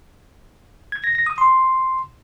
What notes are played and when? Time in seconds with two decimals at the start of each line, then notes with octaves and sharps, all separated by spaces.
0.92 G#6
1.04 A#6
1.15 A#6
1.26 D#6
1.38 C6